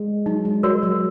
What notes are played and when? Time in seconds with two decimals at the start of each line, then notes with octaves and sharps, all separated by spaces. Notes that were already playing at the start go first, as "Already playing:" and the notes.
Already playing: G#3
0.26 F#3 D#4
0.45 G#3
0.63 G3 F#4 A#4 C#5
0.83 F#3